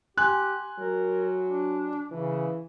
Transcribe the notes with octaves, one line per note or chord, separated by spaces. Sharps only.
G4 G#5 C6 F#6
F#3 A#4
D4
C#3 E3